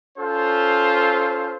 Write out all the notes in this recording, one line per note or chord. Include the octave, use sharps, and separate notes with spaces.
C#4 F4 A4 C5